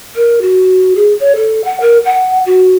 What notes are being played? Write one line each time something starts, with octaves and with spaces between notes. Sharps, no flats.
A#4
F#4
G#4
C#5
A4
F#5
A#4
F#5
F#4